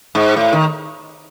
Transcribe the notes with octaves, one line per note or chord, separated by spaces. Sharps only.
G#2
A2
D#3